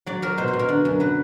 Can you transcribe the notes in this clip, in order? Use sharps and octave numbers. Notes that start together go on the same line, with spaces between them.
F#3 D5
F#3 A#4
B2 C5
C5
B2
A#4
D3
F#2
F#3 B4